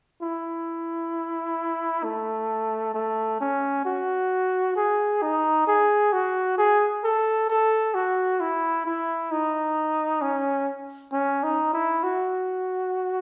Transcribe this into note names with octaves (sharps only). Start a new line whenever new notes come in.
E4
A3
A3
C#4
F#4
G#4
D#4
G#4
F#4
G#4
A4
A4
F#4
E4
E4
D#4
C#4
C#4
D#4
E4
F#4